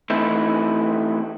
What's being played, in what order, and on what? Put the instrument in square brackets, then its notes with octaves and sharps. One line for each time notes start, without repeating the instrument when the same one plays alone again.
[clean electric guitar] E3 A3 C4 D#4 E4